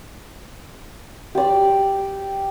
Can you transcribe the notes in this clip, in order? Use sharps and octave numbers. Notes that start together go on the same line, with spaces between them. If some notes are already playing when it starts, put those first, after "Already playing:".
G4 D5